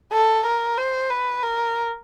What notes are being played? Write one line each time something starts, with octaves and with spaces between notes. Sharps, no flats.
A4
A#4
C5
B4
A#4